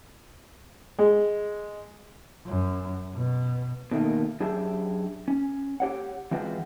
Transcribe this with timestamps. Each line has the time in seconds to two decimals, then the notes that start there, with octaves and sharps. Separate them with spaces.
0.99 G#3
2.46 F#2
3.15 B2
3.91 B2 D#3 A3 A#3
4.40 F#2 D4 G4 G#4 E5
5.28 C#4
5.80 G4 C#5 F#5
6.31 E3 G#3 C4 F4 F#4 B4